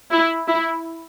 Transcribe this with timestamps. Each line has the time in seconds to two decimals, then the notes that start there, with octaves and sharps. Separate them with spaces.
0.11 E4
0.48 E4